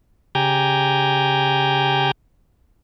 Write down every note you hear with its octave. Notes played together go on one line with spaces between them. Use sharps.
C#3 G4 G5 G#5 A#5